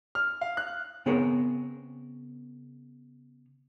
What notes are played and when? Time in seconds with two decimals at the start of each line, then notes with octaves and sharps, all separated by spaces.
0.15 F6
0.41 F5
0.57 F#6
1.06 C#3 B3 C4 G#4 A#4 C#5